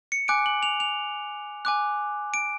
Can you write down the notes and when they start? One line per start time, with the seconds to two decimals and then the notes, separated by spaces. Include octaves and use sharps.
0.12 C#7
0.28 G#5 D6 F#6 D7
0.46 F#7
0.63 F7
0.80 F7
1.65 G#5 D6 F#6
2.34 D7